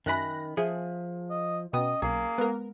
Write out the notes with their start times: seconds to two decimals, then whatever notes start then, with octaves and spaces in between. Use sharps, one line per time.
0.06 F#2 D#3 C#4 E5 G#5 B5 F#6 A#6
0.57 F3 G#4 E5
1.30 D#5
1.73 B2 B3 C#4 D#5 G5 D#6
2.02 B1 A#3 G#4
2.38 G#3 B3 A#4